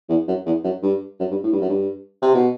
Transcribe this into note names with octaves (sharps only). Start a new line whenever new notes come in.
E2
F#2
E2
F#2
G2
F#2
G2
A2
G2
F#2
G2
C3
B2